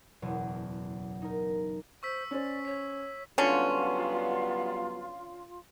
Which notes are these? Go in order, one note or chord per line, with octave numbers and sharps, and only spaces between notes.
F#1 E2 B2
D#4 A#4
C5 C#6 E6 B6
C#4 C5 D5
C#5 B6
D3 F#3 G3 B3 C#4 F4